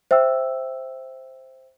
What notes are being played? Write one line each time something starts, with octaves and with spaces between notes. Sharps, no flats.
C5 E5 G5 E6